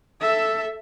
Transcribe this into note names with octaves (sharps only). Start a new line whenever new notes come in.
A4 E5